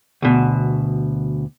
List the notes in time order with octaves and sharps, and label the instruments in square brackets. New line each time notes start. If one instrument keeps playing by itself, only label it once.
[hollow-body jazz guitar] D2 B2